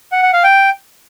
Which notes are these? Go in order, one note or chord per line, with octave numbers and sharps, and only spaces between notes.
F#5
F#5
F5
G5